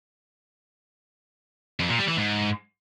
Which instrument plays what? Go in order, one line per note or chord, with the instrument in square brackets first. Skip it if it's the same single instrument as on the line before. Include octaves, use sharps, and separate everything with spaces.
[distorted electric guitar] F2
A#2
G3
E3
G#2